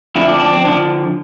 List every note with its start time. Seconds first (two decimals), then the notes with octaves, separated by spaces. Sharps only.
0.15 F2 D3 F3 E4
0.28 D4
0.40 D4
0.53 C4
0.65 D3 F3 D4